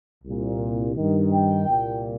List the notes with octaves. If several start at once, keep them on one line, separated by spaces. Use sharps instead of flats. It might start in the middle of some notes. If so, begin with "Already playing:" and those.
C2 A#2
G2 D#3
G5
C2 A#2